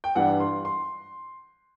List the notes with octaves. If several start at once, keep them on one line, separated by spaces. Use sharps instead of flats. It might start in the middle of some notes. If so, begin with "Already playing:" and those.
G5
G2 E3 G3 F#5
C6
C6